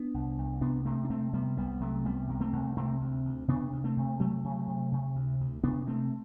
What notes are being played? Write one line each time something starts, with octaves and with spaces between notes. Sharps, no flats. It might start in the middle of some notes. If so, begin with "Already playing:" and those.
Already playing: B3 D4
C2
C2
C3 B3 D4
C3 A3 C4
D4
C3 A3 C4
C3 G3 B3
C2 G3 B3
C3 F#3 A3
C2 G3 B3
C3
A3 C4
C2
C3 A3 C4
D2
D2
C3 B3 D4
D2
A3 C4
C3
C3 F#3 A3
C3
C3
C3
D2
D2
C3 B3 D4
C3 A3 C4